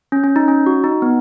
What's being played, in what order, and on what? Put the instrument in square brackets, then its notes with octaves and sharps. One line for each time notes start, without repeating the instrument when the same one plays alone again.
[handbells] C#4
C#4
D#4
C#4
F#4
D#4
B3